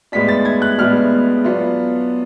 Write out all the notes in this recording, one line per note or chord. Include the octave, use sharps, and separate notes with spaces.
A2 G#3 B3 D4 B6
A6
G#6
F#6
A2 G#3 B3 D4 F6
F#3 B3 D4 F4